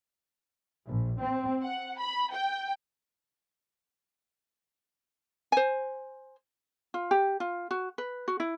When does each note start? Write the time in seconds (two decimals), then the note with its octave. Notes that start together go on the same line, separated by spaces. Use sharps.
0.87 A#1
1.20 C4
1.62 F#5
1.99 B5
2.32 G5
5.52 C5 G#5
6.94 F4
7.11 G4
7.40 F4
7.71 F#4
7.98 B4
8.28 F#4
8.40 E4